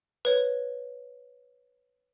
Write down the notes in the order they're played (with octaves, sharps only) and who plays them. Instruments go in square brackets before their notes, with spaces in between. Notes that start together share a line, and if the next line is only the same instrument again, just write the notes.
[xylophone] B4 C#5